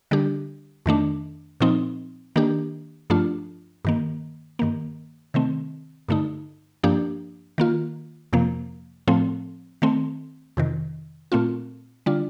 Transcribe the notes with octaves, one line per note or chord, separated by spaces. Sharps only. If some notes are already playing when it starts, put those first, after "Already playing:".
D3 G3 D4 G4
F2 D#3 A3 D4
A#2 F3 C4 D#4
D#3 A#3 D4 G4
G2 F3 A3 D4 F4
G2 D#3 A#3
G2 D#3 A#3
C3 D#3 A3 C4
G2 D3 A3 D#4
G2 F3 A#3 D4 G4
D#3 A#3 F4
F2 C3 F3 A#3
A2 F3 A3 C4
D#3 A3 C4
F2 C3 D#3
A#2 A3 C4 F4
D3 G3 D4 F4